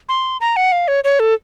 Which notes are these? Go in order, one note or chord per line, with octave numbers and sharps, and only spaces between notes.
C6
A#5
F#5
F5
C#5
C#5
A4